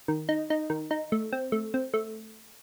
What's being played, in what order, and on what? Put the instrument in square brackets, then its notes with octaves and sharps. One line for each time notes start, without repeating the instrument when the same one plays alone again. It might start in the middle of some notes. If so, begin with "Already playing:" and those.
[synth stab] D#3
D#4
D#4
D#3
D#4
A3
C4
A3
C4
A3